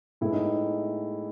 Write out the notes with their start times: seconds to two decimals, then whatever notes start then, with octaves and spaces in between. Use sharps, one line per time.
0.21 A2 G#3 B3 E4
0.33 D#4
0.44 D#4